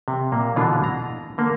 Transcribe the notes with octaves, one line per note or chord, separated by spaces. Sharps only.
C3
A#2 A#3
B2 D3 E3 D4 F4
A#5
D3 A#3